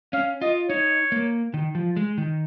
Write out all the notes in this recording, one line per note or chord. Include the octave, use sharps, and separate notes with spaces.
C#4 F5
F4 D#5
D#4 C#5
A#3
D#3
F3
G#3
D#3